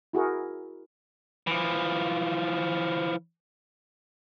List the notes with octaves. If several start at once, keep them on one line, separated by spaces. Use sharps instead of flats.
E4 F#4 G#4 A#4
E3 F3